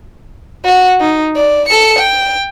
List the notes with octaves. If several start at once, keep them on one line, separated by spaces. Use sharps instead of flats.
F#4 F#5
D#4
D5
A4 C#7
G5